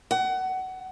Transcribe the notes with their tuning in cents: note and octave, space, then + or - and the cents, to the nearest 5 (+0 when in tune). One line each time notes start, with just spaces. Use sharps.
F#5 +25